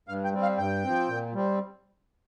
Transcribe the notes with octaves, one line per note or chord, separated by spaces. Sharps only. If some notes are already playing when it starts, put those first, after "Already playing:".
G2 F5
G5
G3 C4
F5
G2 G5
F3 C4
A#2
G3 C4